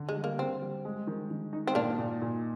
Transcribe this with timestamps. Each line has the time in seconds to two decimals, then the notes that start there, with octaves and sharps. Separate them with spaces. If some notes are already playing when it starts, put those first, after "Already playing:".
Already playing: D3
0.09 G#3
0.16 G3
0.24 A#3
0.39 D3 C4
0.62 G3
0.85 G#3
1.07 D#3
1.30 D#3
1.53 D#4
1.67 C4
1.75 A#2 A#3 D4
1.99 A#2
2.22 A#2